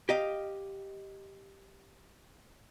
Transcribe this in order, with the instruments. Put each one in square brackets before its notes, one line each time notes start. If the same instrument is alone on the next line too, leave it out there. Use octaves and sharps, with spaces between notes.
[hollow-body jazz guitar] G4 D#5 F5